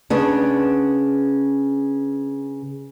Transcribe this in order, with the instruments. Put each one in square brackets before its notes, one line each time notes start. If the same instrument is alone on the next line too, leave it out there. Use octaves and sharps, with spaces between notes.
[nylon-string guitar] C#3 B3 D4